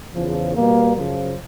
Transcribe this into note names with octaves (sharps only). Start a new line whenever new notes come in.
E2 C#3 F3
B2 G3 A#3
F#2 C#3 F3